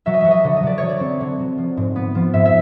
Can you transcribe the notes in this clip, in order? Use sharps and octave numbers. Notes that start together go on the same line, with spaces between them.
F#3 E5
D#5
F#3 E5
D#5
D3
D#5
F#3 D5
F#3 C#5
D5
C4
D3
F#3
F3
G#2
B3
F3
G#2 E5
E5